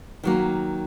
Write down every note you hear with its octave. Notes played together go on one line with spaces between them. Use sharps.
D#3 F#3 A#3